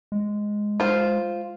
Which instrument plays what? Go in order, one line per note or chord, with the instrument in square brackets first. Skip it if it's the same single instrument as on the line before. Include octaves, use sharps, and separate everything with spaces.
[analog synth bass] G#3
[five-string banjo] F4 C5